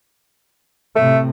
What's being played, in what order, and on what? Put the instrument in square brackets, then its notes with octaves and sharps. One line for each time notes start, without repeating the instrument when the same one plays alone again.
[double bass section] A2 C3 [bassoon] A3